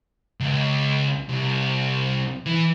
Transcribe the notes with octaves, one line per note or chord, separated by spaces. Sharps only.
C#2
C2
E3